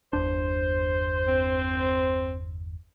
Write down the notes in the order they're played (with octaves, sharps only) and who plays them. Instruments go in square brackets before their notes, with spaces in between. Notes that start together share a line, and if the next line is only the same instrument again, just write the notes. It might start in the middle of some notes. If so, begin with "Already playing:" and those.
[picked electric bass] G1 E2 D4 [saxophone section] C5
[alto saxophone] C4